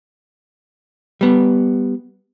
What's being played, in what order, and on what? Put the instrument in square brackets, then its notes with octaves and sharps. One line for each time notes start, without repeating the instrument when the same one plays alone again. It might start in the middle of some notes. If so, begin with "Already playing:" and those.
[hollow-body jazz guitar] G3 B3